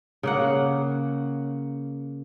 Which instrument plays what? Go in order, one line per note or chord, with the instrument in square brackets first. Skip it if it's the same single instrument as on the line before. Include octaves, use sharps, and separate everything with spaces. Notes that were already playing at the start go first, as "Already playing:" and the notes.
[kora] C#3 A#3 F#5